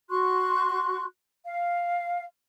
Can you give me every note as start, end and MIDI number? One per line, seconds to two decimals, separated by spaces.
0.10 1.05 66
0.10 1.05 84
0.10 1.05 85
0.10 1.05 90
1.45 2.24 77